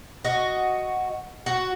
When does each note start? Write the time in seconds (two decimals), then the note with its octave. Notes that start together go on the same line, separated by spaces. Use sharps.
0.25 F#4 D#5
1.46 F#4